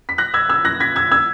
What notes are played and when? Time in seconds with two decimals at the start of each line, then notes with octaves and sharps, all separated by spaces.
0.09 B6
0.18 F#6 A#6
0.34 E6 G#6
0.49 E6 G#6
0.65 F#6 A#6
0.80 G#6 B6
0.96 E6 G#6
1.12 E6 G#6